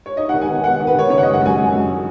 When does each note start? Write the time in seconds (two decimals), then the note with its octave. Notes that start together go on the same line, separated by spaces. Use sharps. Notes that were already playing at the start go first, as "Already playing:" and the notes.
0.06 C#5
0.17 D#4 D#5
0.29 F#5
0.34 D#3
0.42 G#5
0.48 B3
0.64 B3 F#5
0.80 D#3
0.87 B4
0.95 D#3 C#5
1.10 C#3 C#5
1.18 F#5
1.23 F#1 D#5
1.33 F#5
1.41 F#2 G#5
1.58 F#2
1.72 F#2